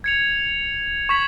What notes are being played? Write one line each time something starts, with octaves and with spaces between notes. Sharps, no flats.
G#6 C#7 F7
C#6 G#6 B6 F#7